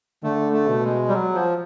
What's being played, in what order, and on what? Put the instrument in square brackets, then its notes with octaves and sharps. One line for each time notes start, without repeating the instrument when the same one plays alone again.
[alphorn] D3 [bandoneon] A3
[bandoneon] A3
[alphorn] B2
[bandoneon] G#3
G3
F#3
F3